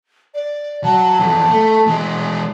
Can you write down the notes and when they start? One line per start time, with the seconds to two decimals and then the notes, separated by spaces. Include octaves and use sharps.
0.34 D5
0.84 F#3 A5
1.20 F2 E3
1.50 A3
1.87 E3 G#3